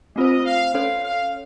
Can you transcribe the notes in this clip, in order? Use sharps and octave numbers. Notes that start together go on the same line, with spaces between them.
A3 C4 F4 C5 D#5
F5
C#4 A4 C#5 F5
F5